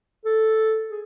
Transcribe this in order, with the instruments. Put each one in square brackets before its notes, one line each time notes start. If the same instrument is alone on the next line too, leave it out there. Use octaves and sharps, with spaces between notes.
[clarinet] A4
G#4